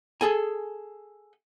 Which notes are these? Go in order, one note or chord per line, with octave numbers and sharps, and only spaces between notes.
G#4 A4 G#5